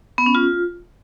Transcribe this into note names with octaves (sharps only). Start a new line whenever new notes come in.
B3
C#4
F4